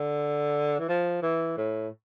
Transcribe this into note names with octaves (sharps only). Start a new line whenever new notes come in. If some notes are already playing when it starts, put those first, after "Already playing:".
Already playing: D3
E3
F3
E3
A2